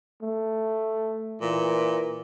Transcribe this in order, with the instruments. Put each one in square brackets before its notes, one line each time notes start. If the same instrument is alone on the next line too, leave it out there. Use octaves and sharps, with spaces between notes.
[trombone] A3
[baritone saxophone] A#2 [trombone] E3